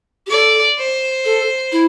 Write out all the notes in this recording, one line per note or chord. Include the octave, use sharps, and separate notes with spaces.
G4
A4 D5
C5
A4
E4